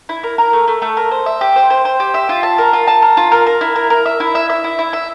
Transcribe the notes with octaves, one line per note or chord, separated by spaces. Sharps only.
E4
A#4
A#4
A3
A3
A3
A#4
C5
E5
G4
C5
C5
C5
G4
E5
F4
A5
A#4
F4
A5
A#4
F4
A#4
A#4
E4
A#4
A#4
E5
E4
E5
E5
E4
E4
E5